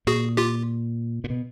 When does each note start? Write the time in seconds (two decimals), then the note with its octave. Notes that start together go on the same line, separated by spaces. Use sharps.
0.07 A#2 F#4 G#4
0.37 F4 G4
1.24 A#2
1.30 B2